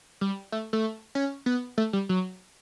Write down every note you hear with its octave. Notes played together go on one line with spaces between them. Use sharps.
G3
A3
A3
C#4
B3
A3
G3
F#3